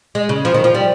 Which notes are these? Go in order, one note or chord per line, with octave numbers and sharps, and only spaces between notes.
G#3
C#3
F3
D#3
F3
G3